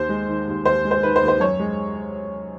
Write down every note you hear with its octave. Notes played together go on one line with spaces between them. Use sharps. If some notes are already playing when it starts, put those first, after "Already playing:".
Already playing: D#2 C5
G#3
D#3
D#2
D#2 C5
G#3
C5
D#3 B4
C5
D#2
C5
F#2 C#5
G#3